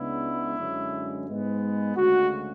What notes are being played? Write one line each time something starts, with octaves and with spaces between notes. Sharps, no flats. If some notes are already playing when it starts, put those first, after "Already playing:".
Already playing: C#2 C#3 G#3 B3 D4 E4
F#2 D3 G#3 C#4
G#2 G#3 B3
D2 C#3 G#3 F#4